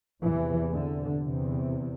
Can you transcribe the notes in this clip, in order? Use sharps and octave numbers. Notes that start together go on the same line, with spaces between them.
E2 C3 E3
D3
E2 C3